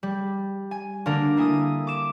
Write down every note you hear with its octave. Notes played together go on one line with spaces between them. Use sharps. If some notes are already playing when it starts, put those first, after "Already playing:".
G3
G#5
D3 A#3 D4 A#4
A#3 E4 G#5 D#6
D6 E7